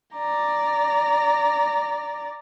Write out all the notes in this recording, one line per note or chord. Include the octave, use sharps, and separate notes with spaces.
D5 A#5